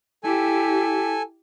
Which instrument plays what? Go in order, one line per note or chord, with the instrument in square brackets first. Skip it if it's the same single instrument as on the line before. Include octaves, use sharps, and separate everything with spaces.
[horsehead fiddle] E4 G4 [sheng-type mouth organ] A4 G#5